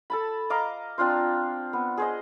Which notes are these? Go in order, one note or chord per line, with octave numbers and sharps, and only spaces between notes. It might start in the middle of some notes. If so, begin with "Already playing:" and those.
A4 A5 B5
D#5 F5 A#5 D6
C4 D4 F4 C5
B3
G#4 C5 D#5